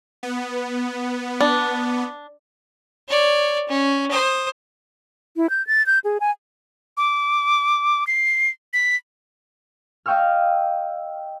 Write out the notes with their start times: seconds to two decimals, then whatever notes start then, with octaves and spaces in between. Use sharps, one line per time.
0.23 B3
1.41 D4
3.08 C#5 D5
3.68 C#4
4.11 C5 D#6
5.37 E4
5.50 G6
5.67 A6
5.86 G6
6.04 G#4
6.20 G#5
6.97 D6
8.07 C7
8.73 B6
10.06 D#5 F5 G5 C#6 E6 F6